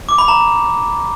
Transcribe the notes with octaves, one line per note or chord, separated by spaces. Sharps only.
D6
B5
A#5